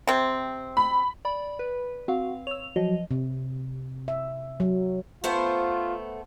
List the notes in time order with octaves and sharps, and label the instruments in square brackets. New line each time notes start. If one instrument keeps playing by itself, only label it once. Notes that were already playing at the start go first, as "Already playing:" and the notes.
[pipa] C3 C4
[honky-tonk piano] B5
[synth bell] D5 B5
B4
[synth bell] C4 F5 [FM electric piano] F#4
[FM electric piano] C#5 E6 [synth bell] F7
[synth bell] F3 D#5 [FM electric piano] F#3
[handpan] C3
E5
F#3
[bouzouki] A3 B3 C5 [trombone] F4